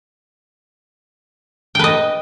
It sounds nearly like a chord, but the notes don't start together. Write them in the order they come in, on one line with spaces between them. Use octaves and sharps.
G5 B4 D#5